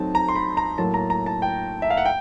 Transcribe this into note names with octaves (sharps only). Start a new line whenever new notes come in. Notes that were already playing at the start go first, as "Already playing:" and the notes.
Already playing: F#3 A3 C4 D#4 A5
A#5
C6
B5
A#5
A2 F#3 A#3 A5
A#5
A#5
A5
G5
E5
F5
F#5
G5